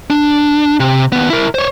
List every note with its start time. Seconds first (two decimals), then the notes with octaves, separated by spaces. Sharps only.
0.10 D4
0.80 C3
1.12 D#2 B3
1.30 E4 A#4
1.55 C5 C#5